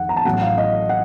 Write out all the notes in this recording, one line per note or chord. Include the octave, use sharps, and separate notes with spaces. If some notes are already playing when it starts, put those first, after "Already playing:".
Already playing: F2 D#3 F#5
A#5
A5
A1 A2 F#3 F#5
F5
D#5
F#5